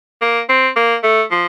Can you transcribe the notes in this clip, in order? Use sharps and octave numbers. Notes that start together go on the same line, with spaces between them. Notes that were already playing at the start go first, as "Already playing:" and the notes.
A#3
C4
A#3
A3
F3